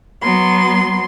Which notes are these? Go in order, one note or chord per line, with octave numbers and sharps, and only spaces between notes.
F#3 B3 C6